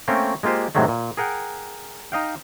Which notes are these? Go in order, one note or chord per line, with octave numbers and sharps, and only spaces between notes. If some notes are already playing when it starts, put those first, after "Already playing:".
A3 A#3 C4 C#4 A#4 G5
G#3 A#3 F4 G4 C5
A2 C3 D#3 F#3 G#3 A3
A#2
G#4 A#4 F#5 G5
D#4 D#5 F5 G5